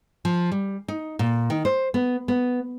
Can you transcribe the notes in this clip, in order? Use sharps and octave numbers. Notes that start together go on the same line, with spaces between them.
F3
G3
D#4
A#2
D#3
C5
B3
B3